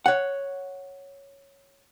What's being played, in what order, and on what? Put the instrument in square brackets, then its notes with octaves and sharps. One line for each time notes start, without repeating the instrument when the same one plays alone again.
[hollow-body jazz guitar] C#5 F#5